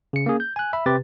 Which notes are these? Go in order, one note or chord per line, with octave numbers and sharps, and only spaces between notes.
C#3 C#7
A#3 C#4 G#4
G6
G#5 F#6
E5 B5
C3 G4 B4 A6